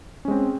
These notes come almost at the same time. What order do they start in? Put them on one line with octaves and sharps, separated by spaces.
C#4 G#3 C4